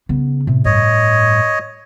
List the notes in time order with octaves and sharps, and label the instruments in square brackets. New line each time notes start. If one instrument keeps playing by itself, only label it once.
[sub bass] C#3 [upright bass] B3
[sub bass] A2 [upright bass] C3
[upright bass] G2 [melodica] C#5 D#5